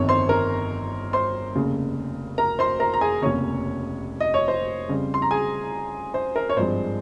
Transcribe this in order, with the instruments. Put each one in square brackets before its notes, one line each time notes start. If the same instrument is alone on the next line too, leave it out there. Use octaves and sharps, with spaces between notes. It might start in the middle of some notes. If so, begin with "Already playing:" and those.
Already playing: [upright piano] G1 F2 D#3 C#5
C5 C6
A#4 A#5
C5 C6
F1 D#2 C#3
A#4 A#5
C5 C6
A#4 A#5
A#5
G#4 G#5
F1 D#2 C#3 C#4 C#5
D#5
C#5
C5
F2 C#3 G3
C6
A#5
G#4 G#5
C5
A#4
C#5
G#1 G2 F3 G#3 C5